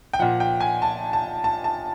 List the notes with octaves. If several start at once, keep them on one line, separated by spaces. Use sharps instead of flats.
G5
A#2 F3 F#5
G5
G#5
A5
A5
A5
A5